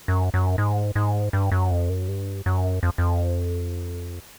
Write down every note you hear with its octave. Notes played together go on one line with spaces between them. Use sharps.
F#2
F#2
G#2
G#2
G2
F#2
F2
F#2
G2
F#2
F2
F2